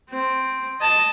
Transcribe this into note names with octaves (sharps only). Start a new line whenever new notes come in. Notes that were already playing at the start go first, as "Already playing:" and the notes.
C4
D#5 A5